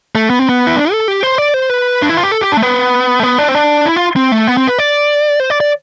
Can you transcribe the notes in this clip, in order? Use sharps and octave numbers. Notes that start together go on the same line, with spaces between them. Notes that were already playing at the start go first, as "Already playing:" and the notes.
A3
B3
C4
B3
E4
D4
A4
G4
C5
D5
C5
B4
D4
E4
F4
G4
A4
G4
D4
A3
B3
A3
B3
D4
C4
D4
E4
F4
C4
A3
B3
C4
B4
D5
C5
D5
D5